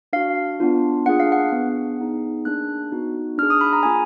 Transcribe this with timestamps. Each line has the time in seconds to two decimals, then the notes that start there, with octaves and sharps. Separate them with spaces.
0.13 D4 F#4 F5
0.60 B3 D4 F4
1.06 A#3 D4 F4 G#4 F#5
1.20 F5
1.32 F#5
1.52 B3 D4 G#4
1.99 B3 D#4 G#4
2.45 A#3 D4 G#4 F#6
2.92 B3 D#4 F#4
3.38 D4 F6
3.43 G#4
3.50 D#6
3.61 B5
3.73 A#5
3.83 A#3 F4 G#4 G#5